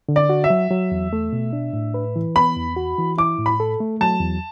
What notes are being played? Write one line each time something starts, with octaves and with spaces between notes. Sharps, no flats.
D3
D5
F#4
E5
F#3
F#3
E2
A3
B2
D4
A2
B4
E3
B3 B5
E2
F#4
E3
E4 D6
A2
B5
A4
A3
F#3 A5
E2